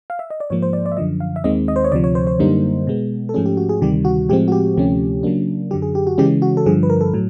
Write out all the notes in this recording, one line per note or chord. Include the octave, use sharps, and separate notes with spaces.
F5
E5
D#5
D5
G#2 F3 A#3 C#5
C5
D5
D5
E5
F#2 D3 F3 D#5
F5
E5
D#2 D#3 G#3 C4 D#5
D#5
C5
C#5
D2 C3 F3 D5
C#5
C5
C5
F#2 D3 G3 A#3 D#4
B2 G#3 B3
A4
G#2 F3 A3 C#4 G#4
G4
F#4
G#4
D2 C3 D#3 G3 G4
F#4
A2 F3 G#3 C4 G4
F#4
G4
D2 C3 F3 A3 C#4
C#3 F#3 A#3 D4
F#2 D3 F#3 G4
G#4
G4
F#4
C#3 E3 G#3 C#4 G4
F#4
A4
G2 D3 F3 G#4
B4
A#4
A4
A2 F#3